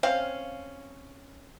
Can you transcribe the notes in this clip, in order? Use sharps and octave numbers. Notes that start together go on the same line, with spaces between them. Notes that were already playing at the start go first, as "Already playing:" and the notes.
C4 C#4 F5